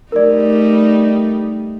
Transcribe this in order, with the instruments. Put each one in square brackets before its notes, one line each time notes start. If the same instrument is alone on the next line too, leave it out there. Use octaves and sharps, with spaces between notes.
[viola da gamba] G3 A3 D#4 [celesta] A#4 D5